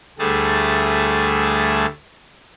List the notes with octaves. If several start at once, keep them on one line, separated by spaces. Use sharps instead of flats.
D2 G3 A3 G#4 A5